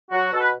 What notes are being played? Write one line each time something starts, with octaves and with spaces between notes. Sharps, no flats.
F#3 F#4
B2 A4
B4